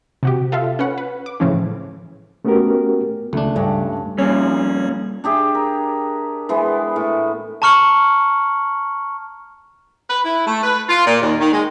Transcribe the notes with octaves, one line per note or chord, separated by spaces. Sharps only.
C3 F#4 G4
F4 A4 E5 F5
C#4 B4 F#5
B4
D6
A2 C#3 E3 F3 C#4
A3 B3 C#4 F#4 G4 A#4
C#2 A3 D4
G2 C#4
F2 A#2 G3 C#4
D4 G4 G#4 E5
A#4
E3 G#3 B3
A2
A5 A#5 C#6 F6 C#7 F#7
B4
E4
A3
B4
F4
A#2
D#2
D#3
G#3